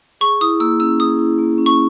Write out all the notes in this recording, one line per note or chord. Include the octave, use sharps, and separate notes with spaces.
G#4 C#6
E4 D#6
A#3 E6
C#4 E6
G#4 D#6
E4
A#3
C#4
C#6